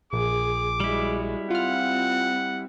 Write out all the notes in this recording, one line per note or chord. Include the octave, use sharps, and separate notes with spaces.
A#1 G#4 D6
G3 G#3 E4 F#4
C4 F4 F#5 F6